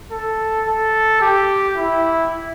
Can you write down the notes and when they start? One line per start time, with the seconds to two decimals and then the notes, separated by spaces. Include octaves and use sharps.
0.12 A4
0.67 A4
1.22 G4
1.77 E4